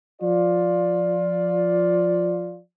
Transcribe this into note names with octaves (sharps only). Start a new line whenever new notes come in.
F3 F4 D5